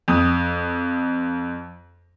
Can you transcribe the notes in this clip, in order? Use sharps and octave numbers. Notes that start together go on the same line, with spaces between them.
F2 D#6